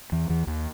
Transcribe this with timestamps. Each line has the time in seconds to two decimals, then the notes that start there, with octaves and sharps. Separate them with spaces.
0.12 E2 E3
0.29 E2 E3
0.47 D#2 D#3